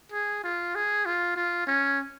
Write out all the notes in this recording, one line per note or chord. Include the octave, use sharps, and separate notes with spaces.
G#4
F4
G#4
F4
F4
C#4